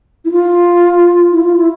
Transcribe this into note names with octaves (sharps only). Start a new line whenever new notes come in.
E4
F4
E4
F4
E4